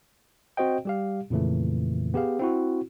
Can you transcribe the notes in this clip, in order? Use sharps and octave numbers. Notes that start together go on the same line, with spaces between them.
C4 F#4 C5 D#5 G5
G3 G4 F5
F2 A#2 C#3 E3 A3
B3 G4 G#4 F5
C4 E4 F#4